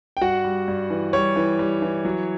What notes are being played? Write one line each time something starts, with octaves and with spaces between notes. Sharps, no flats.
G5
G2 F#4 F#5
G3
G2
E3
G3 C#5 C#6
E3
G3
E3
F#3